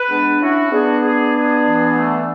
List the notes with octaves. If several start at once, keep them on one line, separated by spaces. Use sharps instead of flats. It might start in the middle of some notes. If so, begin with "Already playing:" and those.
Already playing: B4
G#3 B3 D4
C#4 E4 F#4
B3 D4 G#4
G#4
G#4
E3
A3